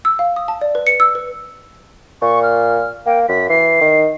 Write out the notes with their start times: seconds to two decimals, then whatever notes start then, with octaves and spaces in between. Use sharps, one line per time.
0.05 E6
0.19 F5
0.36 D#6
0.48 A5
0.61 D5
0.75 B4
0.87 C#7
1.00 E6
1.15 B4
2.22 A#2 C#6
2.43 F6
3.06 A#3 G5
3.28 F#2 B6
3.49 E3 C7
3.81 D#3